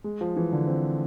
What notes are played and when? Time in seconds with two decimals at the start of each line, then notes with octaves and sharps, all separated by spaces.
0.04 G#3
0.21 F3
0.37 E3
0.53 D3
0.67 C4